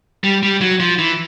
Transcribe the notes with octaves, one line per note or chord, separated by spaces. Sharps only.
G3
G3
F#3
F3
E3